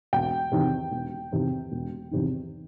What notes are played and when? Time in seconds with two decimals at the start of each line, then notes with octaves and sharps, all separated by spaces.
0.13 E1 G5
0.52 E2 C3 D#3
0.91 E1
1.32 E2 C3 D#3
1.72 E1
2.11 E2 C3 D#3